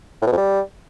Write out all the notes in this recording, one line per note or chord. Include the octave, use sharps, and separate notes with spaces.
A2
B2
F2
G3